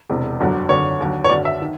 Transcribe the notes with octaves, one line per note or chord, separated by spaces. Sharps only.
E1 E2 C3
G1 F#2 D3 F#3
G#1 F#2 D3 C#5
D#2 D3 F#3
C#5
G#1 F#2 D3 F#3 D5
E5
D#3